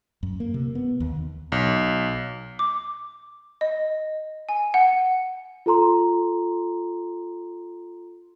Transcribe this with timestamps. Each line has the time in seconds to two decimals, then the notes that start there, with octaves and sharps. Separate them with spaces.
0.23 F#2
0.40 A#3
0.54 C3
0.75 B3
1.00 D#2
1.52 B1
2.59 D6
3.61 D#5
4.49 G#5
4.74 F#5
5.66 F4 A4 A#5 C6